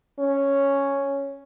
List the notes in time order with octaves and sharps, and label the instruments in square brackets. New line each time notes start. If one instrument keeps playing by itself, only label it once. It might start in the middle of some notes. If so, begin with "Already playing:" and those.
[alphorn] C#4